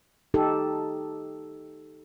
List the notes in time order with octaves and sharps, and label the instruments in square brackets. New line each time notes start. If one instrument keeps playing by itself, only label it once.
[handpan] D#4 G4 A4